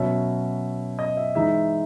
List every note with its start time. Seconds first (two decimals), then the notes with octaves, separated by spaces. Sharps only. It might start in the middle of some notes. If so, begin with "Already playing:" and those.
Already playing: B2 F#3 C#4 E5
0.99 D#5
1.17 E5
1.35 E3 G#3 D#4 E5